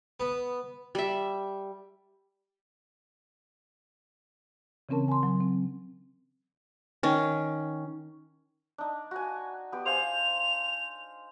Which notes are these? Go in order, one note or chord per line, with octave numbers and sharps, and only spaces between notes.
B3
G3 E5
C#3 E3 C4 C#4 A#4 A5
G#5 A5 C6
F#3
C4
D#3 C#4
D4 D#4
F#4 G#5
B3 G4
C5 F5 G#5 F7